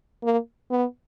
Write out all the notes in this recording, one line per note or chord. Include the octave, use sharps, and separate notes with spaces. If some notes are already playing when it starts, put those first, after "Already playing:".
A#3
B3